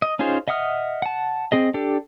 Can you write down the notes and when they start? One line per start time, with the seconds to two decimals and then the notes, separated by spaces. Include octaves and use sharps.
0.02 D#5
0.19 C#4 D#4 F4 G#4 C5
0.48 D#5 E5 F#5 D#6 F6
1.02 F#5 A5
1.52 C4 G#4 D#5
1.74 D4 G4 A4